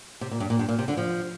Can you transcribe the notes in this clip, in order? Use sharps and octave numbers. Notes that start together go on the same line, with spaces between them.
C3
A#2
G2
A#2
G2
A#2
C3
D3
F3